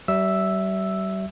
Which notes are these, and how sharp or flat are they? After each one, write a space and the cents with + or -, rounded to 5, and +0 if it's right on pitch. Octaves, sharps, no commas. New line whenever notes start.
G3 -40 E5 +0 E6 +0